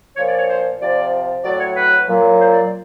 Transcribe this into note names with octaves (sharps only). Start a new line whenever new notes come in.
A#2 F3 C#5
D5
C#5
C5
C3 F3 D5
A2 F#3 D5
C#5
B4
A#2 F#3
C5
D5